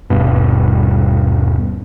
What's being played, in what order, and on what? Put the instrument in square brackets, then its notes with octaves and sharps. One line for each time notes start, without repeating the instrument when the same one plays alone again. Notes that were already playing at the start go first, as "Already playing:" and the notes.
[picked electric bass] D#1 G2 B2